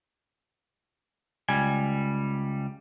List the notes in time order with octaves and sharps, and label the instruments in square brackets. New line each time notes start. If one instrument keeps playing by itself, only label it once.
[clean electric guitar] C#2 G3 G#5